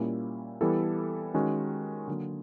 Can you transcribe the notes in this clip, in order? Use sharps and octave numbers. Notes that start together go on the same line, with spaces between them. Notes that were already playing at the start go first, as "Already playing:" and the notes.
Already playing: A#2 G3 A#3 C#4 E4
E3 G3 B3 E4 A4
D#3 G#3 C#4 F#4
D3 F#3 A#3